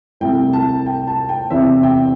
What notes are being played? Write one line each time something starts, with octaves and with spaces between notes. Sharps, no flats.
C2 C3 A3 E4 G5
A5
G5
A5
G5
E2 C3 E3 C4 E5
G5